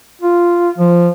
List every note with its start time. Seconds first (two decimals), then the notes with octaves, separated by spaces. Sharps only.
0.22 F4
0.78 F3